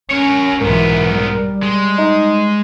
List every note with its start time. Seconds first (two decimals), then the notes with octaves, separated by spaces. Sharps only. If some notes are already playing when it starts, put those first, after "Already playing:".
0.11 C#4 A#4 C#5
0.61 B1 G#2 E3 B3 A#4
1.14 G3
1.63 G#3
1.98 D#4